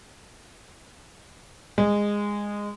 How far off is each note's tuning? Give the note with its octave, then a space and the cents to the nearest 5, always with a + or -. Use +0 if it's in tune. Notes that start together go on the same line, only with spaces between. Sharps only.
G#3 -15